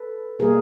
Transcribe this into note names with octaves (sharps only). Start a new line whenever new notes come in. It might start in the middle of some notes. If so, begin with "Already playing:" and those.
Already playing: A4 B4
B2 G3 A#3 G#4 A#4